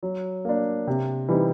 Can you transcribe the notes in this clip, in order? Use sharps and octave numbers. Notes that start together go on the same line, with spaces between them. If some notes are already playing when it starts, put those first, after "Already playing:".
F#3
A#3 D4
C3
E3 G3 C4 D#4